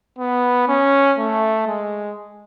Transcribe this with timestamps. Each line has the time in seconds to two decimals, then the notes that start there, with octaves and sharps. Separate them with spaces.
0.19 B3
0.68 C#4
1.18 A3
1.68 G#3